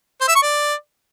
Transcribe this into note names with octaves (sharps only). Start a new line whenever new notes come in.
C5
E5
C#6
D5